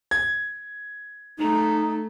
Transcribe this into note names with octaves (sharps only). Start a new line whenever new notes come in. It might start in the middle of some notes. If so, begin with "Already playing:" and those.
G#6
A3 D#4